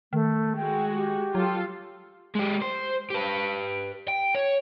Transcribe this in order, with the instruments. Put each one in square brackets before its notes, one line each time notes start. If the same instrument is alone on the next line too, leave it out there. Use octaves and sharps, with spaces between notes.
[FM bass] D#3 [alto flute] A3
[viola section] G#3 F#4 [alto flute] G5
[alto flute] G4
[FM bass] F#3 [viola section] F4 A4
[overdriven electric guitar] G#3 G4
C5
G4 B4
G5
C#5